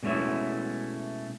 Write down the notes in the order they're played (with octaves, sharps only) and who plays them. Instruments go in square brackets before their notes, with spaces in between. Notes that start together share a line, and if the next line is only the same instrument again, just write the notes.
[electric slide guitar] B2 G#3 A3 C#4 E4